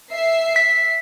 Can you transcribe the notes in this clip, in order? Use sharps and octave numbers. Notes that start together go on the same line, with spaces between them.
E5 C7
B6